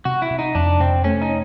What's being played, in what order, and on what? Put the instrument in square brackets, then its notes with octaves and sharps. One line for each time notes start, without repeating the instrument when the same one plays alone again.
[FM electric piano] C3 [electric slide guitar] F#4
[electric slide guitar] E4
[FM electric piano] C3
[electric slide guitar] D#4
[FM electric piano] F2 [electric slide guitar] D4
[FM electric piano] C3 [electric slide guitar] C4
[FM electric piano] A3 [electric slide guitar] C#4
[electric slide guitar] D#4